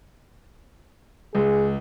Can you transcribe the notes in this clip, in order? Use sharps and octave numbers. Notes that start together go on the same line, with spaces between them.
C#2 G#4